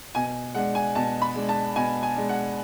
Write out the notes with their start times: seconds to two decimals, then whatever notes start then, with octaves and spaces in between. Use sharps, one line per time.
0.15 B2 G#5
0.55 G#3 D4 F#5
0.75 G#5
0.95 B2 A5
1.22 B5
1.36 G#3 D4
1.49 A5
1.76 B2 G#5
2.03 G#5
2.16 G#3 D4
2.29 F#5